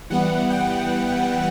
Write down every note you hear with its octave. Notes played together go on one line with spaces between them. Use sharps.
E3 G3 B3 F#5
G5